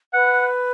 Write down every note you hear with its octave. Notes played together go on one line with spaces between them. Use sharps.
B4 F#5